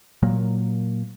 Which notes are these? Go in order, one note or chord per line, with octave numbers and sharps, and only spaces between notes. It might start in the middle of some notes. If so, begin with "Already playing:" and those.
A#2 F#3 A#3